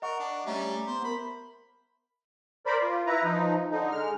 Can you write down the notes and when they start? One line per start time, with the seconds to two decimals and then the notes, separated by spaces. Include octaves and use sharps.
0.02 A#4 D#5 F#5 C#6
0.19 D4
0.46 G3 A3 C#4 E5 A#5 D6
0.87 B3 C5
1.04 A#4 B5
2.66 A#4 C5 D5 B5
2.82 F4
3.06 E4 B4 A#5
3.24 F3 D#4
3.71 D3 D#4
3.91 G#3 F6